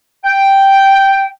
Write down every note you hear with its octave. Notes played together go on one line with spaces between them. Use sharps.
G5